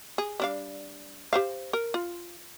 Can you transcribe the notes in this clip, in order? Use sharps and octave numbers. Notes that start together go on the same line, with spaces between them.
G#4
G3 D4 F5
G4 C5 F5
A#4
F4